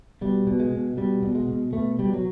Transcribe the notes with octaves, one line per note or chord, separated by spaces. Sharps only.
B2 G3
B2
G#3
B2
B2 G3
B2
G#3
B2
B2 A3
B2 G3
F#3